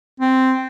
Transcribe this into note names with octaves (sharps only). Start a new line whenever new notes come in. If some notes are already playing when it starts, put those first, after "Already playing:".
C4